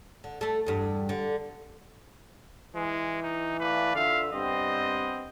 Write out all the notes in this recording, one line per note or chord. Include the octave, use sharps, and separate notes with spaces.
D3
A3 A4
E2 G2
D3
E3 G#3
D#4
A3 B4 D5 F5
D3 F4 E5 F5
G2 B3 C4 D#5